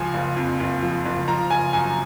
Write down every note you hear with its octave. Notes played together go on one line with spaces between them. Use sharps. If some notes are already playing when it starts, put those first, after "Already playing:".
Already playing: C#2 F3 G#5
F#1
F2
F#1
F3
F#1
F3 A#5
F#1 G#5
F#2 G#5